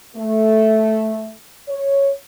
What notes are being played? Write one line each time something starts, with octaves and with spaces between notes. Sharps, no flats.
A3
C#5